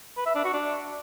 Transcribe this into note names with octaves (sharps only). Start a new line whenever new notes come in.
B4
E5
D4
F#4
D4